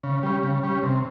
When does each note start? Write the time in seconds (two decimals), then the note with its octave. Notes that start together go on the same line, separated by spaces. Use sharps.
0.03 C#3
0.23 G3 C#4
0.43 C#3
0.63 G3 C#4
0.83 C3